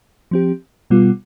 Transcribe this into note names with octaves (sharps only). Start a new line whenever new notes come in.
F3 C4 G4
B2 G3 B3 F4